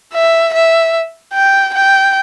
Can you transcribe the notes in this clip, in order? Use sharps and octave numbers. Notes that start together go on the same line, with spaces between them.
E5
E5
G5
G5